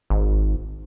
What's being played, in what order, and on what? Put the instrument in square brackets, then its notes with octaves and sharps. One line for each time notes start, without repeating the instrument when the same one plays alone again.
[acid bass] G#1